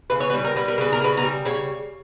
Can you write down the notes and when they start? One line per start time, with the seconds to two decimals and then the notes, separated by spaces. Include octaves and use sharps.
0.10 C#3 B4
0.20 C#5
0.30 B4
0.33 G3
0.44 A#4
0.56 G3 B4
0.68 A#4
0.78 C#3 B4
0.92 A#4
1.00 C#3 B4
1.17 A#4
1.23 G3
1.45 C#3 C#5